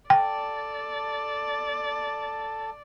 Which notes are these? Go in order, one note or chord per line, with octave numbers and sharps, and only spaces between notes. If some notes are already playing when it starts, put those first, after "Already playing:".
A4 D5 G5 A5